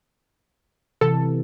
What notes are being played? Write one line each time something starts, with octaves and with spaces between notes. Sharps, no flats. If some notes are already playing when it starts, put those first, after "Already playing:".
C3 E3 A4